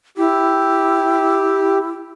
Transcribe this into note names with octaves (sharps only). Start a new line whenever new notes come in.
E4 G4